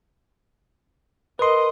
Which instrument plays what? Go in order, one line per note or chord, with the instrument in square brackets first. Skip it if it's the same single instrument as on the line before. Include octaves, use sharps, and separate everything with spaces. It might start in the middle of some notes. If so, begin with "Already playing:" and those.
[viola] A#4 D#5 [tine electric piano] B4 C6